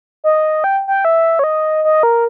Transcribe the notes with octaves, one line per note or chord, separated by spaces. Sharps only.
D#5
G5
G5
E5
C#5
D#5
D#5
A#4